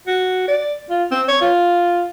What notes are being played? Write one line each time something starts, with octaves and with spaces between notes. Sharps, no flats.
F#4
D5
F4
C4
C#5
F4